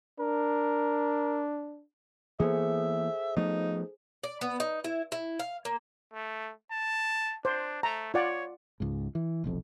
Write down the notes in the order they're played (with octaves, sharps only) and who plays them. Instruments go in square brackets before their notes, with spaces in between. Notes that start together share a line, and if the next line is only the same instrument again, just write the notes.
[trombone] D4 [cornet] A#4
[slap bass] E3 A#3 B3 [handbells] G#4 A4 C5 [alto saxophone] E5
[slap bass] F3 A3 B3 [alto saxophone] D#4
[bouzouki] D5
B3
D#4
E4
E4
F5
A#3
[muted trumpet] A3
A5
[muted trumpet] D4 [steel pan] C5
[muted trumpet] A3 [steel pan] A#5
[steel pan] F4 D5 F#5 [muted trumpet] C#5
[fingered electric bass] C#2 G#2
E3
F1 B1 F2